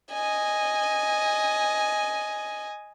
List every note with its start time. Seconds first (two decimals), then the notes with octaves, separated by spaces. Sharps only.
0.12 D#5 G#5